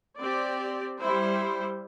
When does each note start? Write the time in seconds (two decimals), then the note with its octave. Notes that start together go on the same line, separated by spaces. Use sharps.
0.21 C4 G4 D5
1.00 G3 E4 C5